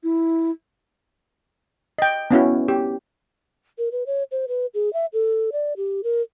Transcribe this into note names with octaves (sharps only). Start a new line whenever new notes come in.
E4
D#5 G5
B3 C#4 E4 F#4
G4
A#4
B4
C#5
C5
B4
G#4
E5
A4
D5
G4
A#4